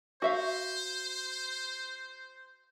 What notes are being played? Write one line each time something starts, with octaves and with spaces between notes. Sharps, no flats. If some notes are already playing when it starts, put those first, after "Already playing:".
F#4 C5 E5 F5